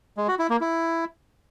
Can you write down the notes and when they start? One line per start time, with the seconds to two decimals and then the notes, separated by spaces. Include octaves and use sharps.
0.17 G#3
0.28 F#4
0.39 E4
0.50 A#3
0.61 E4